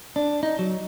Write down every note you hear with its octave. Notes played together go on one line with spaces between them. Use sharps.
D4
D#4
F#3